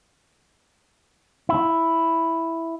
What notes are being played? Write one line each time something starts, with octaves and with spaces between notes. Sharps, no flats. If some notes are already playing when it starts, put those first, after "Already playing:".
E4